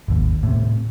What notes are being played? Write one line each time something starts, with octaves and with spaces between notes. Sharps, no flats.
G#1 D#2
A2 C3